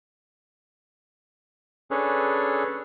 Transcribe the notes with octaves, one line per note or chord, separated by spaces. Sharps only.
C#4 D4 G#4 A4 B4 C#5